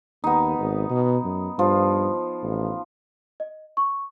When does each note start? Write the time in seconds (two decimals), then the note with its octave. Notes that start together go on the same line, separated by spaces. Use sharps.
0.24 D#2 B3 D#4
0.59 G#1
0.90 B2
1.25 F#2
1.59 G2 F3
2.43 A1
3.40 D#5
3.77 C#6